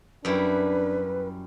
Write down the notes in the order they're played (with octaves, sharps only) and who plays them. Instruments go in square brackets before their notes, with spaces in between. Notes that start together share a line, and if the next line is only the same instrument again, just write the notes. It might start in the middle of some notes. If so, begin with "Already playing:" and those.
[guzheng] F#2 G3 E4 [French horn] D4 [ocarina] B4